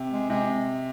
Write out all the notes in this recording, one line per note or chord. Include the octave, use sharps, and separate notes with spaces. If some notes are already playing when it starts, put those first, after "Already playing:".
Already playing: C3
G#3
C3 G#3